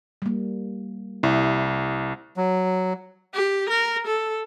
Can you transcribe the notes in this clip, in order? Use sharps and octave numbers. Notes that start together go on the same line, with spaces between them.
G3 A#3
C2 E4
F#3
G4
A#4
A4